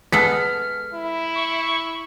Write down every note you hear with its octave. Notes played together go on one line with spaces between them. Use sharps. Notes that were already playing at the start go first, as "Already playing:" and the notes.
G#3 B3 A4 F6 B6
E4
C#6